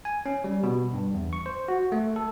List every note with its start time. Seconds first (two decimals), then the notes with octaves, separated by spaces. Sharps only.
0.05 G#5
0.26 C#4
0.44 G3
0.63 B2
0.94 G2
1.14 E2
1.33 C#6
1.46 C5
1.68 F#4
1.92 A3
2.16 A4